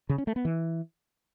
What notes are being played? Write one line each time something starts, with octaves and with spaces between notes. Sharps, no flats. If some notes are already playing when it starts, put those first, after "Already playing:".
C#3
C#4
A3
B3
E3